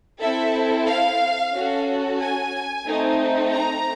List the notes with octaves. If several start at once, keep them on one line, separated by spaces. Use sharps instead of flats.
C4 E4 A4 E5
F5
C#4 F#4 A4
G#5
A3 C4 D#4
A#5